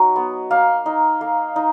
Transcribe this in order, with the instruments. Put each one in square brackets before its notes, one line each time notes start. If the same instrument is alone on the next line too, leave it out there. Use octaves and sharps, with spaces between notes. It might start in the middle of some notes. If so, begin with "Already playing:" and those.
Already playing: [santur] F#3 D#4
B3
A#3 F5
D#4
A#3
D#4